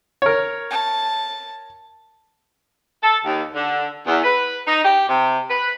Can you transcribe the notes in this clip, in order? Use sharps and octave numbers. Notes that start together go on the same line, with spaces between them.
A#4 C#5
A5
A4
D#2
D3
E2
B4
D#4
G4
C3
B4